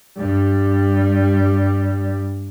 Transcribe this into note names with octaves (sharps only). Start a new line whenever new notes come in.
G2 G3